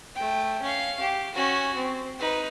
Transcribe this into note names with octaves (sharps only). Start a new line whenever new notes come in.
A3 G5
C#4 F5
G4
C#4 F#4
C4
D#4 B4